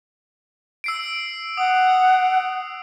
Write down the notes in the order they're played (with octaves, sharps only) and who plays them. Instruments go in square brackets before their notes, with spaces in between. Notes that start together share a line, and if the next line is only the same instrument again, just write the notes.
[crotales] E6 C7 D7
[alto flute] F#5 [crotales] D#6